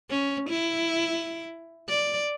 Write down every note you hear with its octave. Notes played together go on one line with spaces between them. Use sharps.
C#4
E4
D5